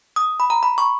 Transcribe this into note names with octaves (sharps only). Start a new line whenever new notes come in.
D#6
B5
A#5
B5
C#6